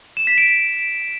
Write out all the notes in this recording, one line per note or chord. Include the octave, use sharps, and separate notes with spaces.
E7
B6
D7